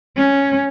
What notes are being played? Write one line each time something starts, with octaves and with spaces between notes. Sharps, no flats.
C#4